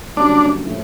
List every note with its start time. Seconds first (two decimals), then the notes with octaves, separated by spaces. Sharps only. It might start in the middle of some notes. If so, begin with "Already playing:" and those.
0.16 F#1 F#2 D3 G3 D4
0.66 A2 F3